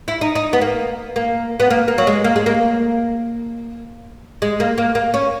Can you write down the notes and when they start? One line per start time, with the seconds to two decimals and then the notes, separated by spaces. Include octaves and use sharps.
0.08 E4
0.21 D#4
0.35 D#4
0.53 B3
0.61 A#3
1.16 A#3
1.60 B3
1.70 A#3
1.88 A#3
1.98 F#3
2.07 G#3
2.24 A#3
2.36 G#3
2.46 A#3
4.42 G#3
4.60 A#3
4.78 A#3
4.95 A#3
5.14 C#4